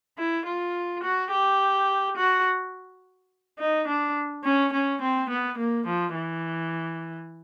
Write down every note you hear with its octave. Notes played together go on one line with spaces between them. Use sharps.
E4
F4
F#4
G4
F#4
D#4
D4
C#4
C#4
C4
B3
A#3
F3
E3